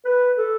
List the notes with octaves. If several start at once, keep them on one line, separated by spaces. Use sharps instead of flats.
B4
A4